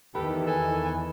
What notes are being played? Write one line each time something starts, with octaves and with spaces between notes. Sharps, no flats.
E2 D#3 E3 G4 A4 B4
A4 G#5